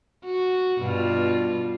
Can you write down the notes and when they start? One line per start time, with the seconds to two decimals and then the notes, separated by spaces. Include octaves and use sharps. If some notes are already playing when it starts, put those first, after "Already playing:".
0.25 F#4
0.79 G2 B2 F4